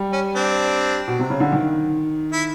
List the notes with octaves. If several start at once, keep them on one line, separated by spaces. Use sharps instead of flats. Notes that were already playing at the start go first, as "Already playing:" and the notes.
Already playing: G3
C#4
C4 D4
B2
C3
C#3
D3
D#3
E4